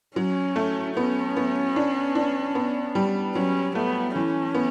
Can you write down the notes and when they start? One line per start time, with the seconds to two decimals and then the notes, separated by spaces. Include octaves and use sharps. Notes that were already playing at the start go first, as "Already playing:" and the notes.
0.16 F#3 C#4
0.56 A3
0.97 B3 C#4
1.37 B3
1.76 D4
2.15 D4
2.55 B3
2.95 G3
3.35 F#3 C#4
3.75 A3 B3
4.16 E3 C#4
4.54 B3